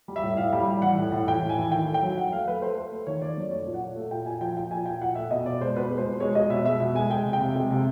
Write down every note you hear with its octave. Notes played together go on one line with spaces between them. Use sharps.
G3
E5
A2
A2 F5
G3
G3
E3 F#5
A2
A2
E3 G5
A2
G#5
E3
D#3 G5
A3
G5
F#3
F#3 F#5
A3 F5
A3 B4
A3 C5
A3
A3
D#3 C#5
D#3 D5
F#2
A3 C#5
A#2
F#5
A#2
A3
A#2 G5
A#2 G#5
F3 G5
F3 G5
A#2 G#5
A#2 G5
A#2 F#5
A3 E5
B2 D#5
B2 D5
G#3 C5
B2 B4
G#3
C5
B2
G#3 C#5
G#3 D#5
B2 E5
G#3 E5
B2
G#3 G#5
G#3 G5
C3
G5
C3
G#3
C3